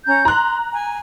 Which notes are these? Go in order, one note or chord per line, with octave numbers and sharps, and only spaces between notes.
C#4 A#5 G6
A#5 C6 F#6
G#5